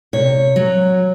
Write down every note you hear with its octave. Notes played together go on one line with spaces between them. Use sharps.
C3 C#5
F#3